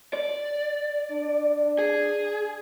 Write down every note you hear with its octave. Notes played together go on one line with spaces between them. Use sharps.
D5
D4
G#4